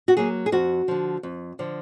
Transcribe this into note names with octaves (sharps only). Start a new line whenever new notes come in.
F#4
F#3 A#3 G#4
G#4
F2 F#4
D3 F3
F2
D3 F3